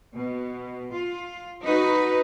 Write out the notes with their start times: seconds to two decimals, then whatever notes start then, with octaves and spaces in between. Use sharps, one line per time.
0.14 B2
0.91 F4
1.63 D#4 F#4 B4